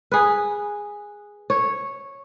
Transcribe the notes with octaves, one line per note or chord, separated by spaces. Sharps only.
G#4 B4
C#5